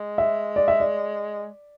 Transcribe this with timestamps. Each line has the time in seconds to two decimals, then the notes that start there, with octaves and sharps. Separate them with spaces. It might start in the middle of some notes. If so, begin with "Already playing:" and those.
Already playing: G#3
0.18 E5
0.56 D5
0.68 E5
0.80 D5